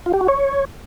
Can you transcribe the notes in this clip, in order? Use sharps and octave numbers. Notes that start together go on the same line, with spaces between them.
F4
G4
F#4
C#5